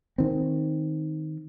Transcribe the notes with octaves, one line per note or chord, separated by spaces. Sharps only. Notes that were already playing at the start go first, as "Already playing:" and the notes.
D#3 C4